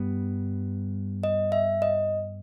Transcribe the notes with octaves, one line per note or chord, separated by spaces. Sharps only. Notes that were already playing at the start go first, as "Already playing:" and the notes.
Already playing: G2 G3 B3
D#5
E5
D#5